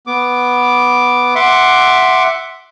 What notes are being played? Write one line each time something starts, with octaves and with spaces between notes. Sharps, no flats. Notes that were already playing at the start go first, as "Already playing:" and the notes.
B3 D6
E5 F#5 C6 D6